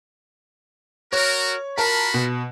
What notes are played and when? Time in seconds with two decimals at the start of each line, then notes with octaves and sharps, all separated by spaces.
1.13 F#4 A#4 C#5
1.78 F4 F#4 A#4 A5 B5
2.14 B2